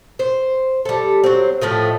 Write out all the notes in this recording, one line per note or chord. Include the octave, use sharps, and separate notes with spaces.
C5
G3 A4
F#3 C4
A2 F3 A3 D#5